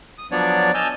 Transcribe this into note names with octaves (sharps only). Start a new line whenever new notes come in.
D#6
F3 F#3 B3 D4 C#5 D5
D#5 G#5 A5 E6 F6 G6